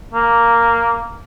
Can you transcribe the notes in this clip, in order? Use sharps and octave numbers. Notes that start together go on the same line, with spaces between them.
A#3